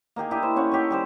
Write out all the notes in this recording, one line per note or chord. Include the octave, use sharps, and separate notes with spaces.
A#3 D#4 G4 G#4
D4 E4 G4 D#5
C5
C#4 C#5 F#5
D#4 G4 A4 C#5
G3 G4 C5